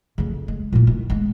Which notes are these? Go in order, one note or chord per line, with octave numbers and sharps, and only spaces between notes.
F2 C#3
G#3
A#2 E4
D#3
G#3 B3